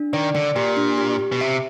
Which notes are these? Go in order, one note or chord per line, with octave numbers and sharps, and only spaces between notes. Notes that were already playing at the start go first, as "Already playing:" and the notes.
Already playing: D4
D#3 D5
D3 D5
A#2 G4
D4
G4
G4
B2
C3 E5